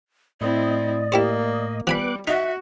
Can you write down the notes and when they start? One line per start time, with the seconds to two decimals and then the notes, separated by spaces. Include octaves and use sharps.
0.41 A2 C4 E4 D5 D#5
1.12 A#3 E4 G4 C5
1.87 F3 G3 B3 G#5 B5 D6 F#6
2.28 D#4 F#4 E5 F#5